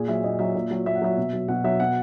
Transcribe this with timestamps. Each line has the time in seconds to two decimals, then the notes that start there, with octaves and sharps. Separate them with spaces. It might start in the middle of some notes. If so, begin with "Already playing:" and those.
Already playing: A#2 G#4
0.08 F#3 E5
0.24 A#2 D#5
0.39 F#3 E5
0.55 A#2
0.71 F#3
0.86 A#2 E5
0.95 F#5
1.02 F#3 E5
1.17 B2
1.33 F#3
1.48 B2 F#5
1.64 F#3 E5
1.80 B2 F#5